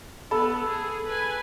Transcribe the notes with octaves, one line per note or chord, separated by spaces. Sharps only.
B3 A4 B5 E6
G#4
B4 G#5